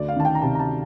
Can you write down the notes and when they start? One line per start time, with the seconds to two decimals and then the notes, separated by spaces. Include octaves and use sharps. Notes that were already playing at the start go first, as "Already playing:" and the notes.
Already playing: D2 D5
0.08 F5
0.16 D#3 A5
0.25 G5
0.35 A#5
0.42 C3 A5
0.55 A#5
0.59 A5